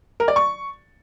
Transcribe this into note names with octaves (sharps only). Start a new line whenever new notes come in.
A#4
D5
C#6